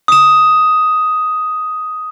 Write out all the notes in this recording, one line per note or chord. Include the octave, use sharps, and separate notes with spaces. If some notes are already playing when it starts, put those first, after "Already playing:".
D#6 E7